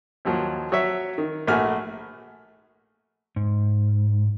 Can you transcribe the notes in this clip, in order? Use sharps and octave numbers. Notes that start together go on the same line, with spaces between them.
D#2 F3 F#3
F#3 C#5 E5
D#3
A#1 A3 F#4 G#5 F6
G#2